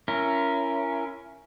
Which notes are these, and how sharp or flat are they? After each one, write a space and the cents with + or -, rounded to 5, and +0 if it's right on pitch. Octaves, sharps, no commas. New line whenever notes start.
C#4 +5 E4 +30 A#4 +0